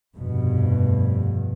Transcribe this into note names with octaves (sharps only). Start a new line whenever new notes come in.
F1 G2 B2